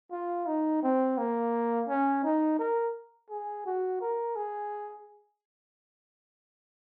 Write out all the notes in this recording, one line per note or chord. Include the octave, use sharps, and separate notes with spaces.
F4
D#4
C4
A#3
C#4
D#4
A#4
G#4
F#4
A#4
G#4